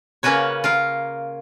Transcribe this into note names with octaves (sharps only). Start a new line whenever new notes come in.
C#3 A#3 C#4 F#4 B4 C#5
F4 A#4 F5